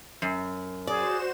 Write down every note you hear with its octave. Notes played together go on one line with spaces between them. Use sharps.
F#2
F#4 G#4 C5 D5 E7